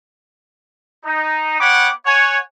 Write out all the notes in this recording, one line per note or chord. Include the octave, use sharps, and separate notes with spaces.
D#4
B3 C#5 F#5 G5 B5 D6
C#5 F#5 G#5